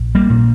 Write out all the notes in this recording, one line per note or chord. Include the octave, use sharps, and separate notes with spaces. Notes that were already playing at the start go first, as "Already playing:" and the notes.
Already playing: A#1
G3 A#3
A#2